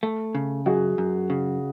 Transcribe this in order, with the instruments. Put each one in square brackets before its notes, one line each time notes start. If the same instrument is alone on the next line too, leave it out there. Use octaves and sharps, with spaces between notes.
[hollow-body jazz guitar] A3
C#3
[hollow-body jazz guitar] F#2 [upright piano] F#4 G#4
[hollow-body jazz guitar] F#2
C#3